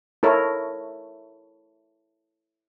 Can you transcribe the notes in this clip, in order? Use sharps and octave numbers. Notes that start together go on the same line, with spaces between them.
E4 A4 A#4 C#5